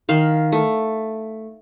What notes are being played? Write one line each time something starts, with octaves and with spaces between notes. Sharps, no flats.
D#3 F5
A3